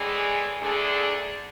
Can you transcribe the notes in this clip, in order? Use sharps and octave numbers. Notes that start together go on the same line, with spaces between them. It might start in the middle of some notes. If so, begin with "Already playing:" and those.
Already playing: A2 E3 G#3 D4 G#4
D2 D3 A3 D4 G#4